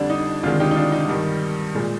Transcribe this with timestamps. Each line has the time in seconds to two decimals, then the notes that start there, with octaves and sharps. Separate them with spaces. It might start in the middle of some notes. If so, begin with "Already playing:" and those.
Already playing: F2 D3 G3 D4
0.10 D#4
0.43 D2 C3 D#3 G#3 D4 F4
0.60 D#4 G4
0.71 D#4
0.76 D4 F4
0.92 D#4
1.09 G2 D#3 G3
1.75 A#2 G#3